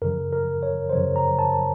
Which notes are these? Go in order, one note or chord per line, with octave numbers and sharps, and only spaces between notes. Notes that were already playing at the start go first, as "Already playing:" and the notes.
F#2 C#3 F3 A#4
A#4
C#5
C5
F#2 C#3 F3 C#5
A#5
A5